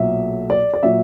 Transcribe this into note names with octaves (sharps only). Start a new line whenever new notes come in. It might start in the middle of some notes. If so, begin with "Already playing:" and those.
Already playing: B1 A#2 F#3 E5
D5
D5
A#2 F#3 E5